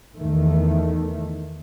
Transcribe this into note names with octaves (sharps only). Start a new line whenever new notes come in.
E2 D#3 A3